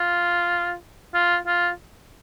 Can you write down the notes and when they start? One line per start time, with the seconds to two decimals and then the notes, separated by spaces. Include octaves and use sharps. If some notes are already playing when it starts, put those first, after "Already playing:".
Already playing: F4
1.14 F4
1.46 F4